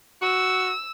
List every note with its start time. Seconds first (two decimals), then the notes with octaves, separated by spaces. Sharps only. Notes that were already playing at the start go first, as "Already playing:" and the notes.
0.22 F#4 E6